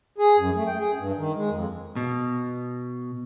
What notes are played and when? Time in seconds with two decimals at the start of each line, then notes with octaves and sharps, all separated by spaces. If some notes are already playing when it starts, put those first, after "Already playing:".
0.18 G#4
0.38 F#2
0.55 A3
0.67 G5
0.80 G#4
0.96 G2
1.18 D#3
1.36 G#3
1.50 F2
1.96 B2